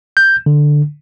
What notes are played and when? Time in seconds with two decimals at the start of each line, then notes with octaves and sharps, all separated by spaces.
0.17 G6
0.46 D3